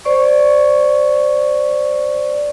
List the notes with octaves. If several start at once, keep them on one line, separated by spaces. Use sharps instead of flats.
C5 D5 C#6